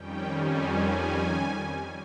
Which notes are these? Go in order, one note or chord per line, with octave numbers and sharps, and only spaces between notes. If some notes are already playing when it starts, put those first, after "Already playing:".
Already playing: F2 D#3 G3 C#4 G5
G#5
G#5